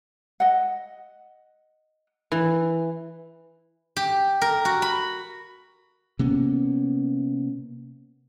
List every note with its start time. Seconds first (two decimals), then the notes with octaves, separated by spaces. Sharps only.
0.40 D#5 F#5
2.32 E3
3.97 G4
4.41 A#4
4.65 F#4
4.82 B5
6.19 C3 A#3 B3 C#4